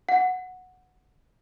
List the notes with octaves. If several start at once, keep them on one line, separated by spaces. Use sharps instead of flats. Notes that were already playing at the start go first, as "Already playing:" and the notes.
F#5